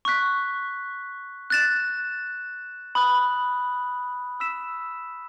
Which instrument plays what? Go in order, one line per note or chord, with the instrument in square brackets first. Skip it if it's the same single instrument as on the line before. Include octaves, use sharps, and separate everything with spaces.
[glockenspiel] C#6 F#6 B6
F#6 A6 E7
B5 D#6 F#6
E6 B6 E7